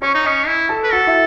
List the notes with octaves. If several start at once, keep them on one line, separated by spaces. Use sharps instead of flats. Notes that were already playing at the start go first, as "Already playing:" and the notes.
C#4 C#5 C#6
D#4
C#4 D#5 D#6
E4
A4 A5
B4
F#4 A4 F#5
E4 E5